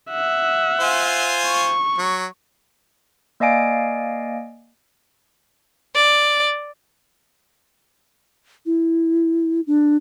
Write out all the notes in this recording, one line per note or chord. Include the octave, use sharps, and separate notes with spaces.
E5 F#5
F4 C5 G#5
C#6
F#3
A#3 D5 D#5 F5 G#5 D7
D5
E4
D4